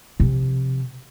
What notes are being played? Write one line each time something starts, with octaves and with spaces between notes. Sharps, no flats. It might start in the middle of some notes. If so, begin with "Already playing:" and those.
C3 F3